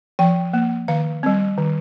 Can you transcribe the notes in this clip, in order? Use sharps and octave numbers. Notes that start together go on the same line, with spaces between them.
F3 G5
A#3
D#3 F5
G3 C4
D#3